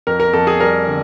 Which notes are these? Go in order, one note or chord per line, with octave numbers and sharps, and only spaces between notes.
F2 A#4
A#4
F2 A4
G#4
G3 A#4
D3